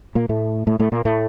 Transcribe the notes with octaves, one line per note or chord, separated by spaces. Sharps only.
A#2 A#3
A2 A3
A2 A3
A2 A3
A#2 A#3
A2 A3